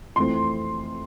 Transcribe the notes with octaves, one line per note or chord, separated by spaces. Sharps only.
F2 E3 A3 C4 C6